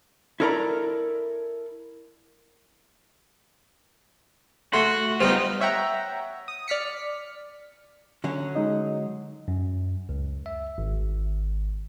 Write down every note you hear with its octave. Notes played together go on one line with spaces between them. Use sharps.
E4 A4 A#4 D5 A#5 B5
A3 F#4 C6
G3 B3 D#4 F4 C5
C#5 E5 F#5 G5 A#5
D#6
D5 F6 B6 C#7
D3 F#3 C#4
G#3 D#4 D#5
F#2
C#2
E5
G#1